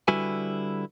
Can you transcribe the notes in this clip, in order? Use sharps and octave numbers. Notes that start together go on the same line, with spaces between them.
D3 G3 E4 F#4 B4 G#5